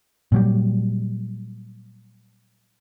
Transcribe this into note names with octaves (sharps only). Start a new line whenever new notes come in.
A#2 F#3 G3